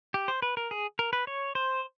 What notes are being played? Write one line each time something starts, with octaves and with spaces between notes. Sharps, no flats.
G4
C5
B4
A#4
G#4
A#4
B4
C#5
C5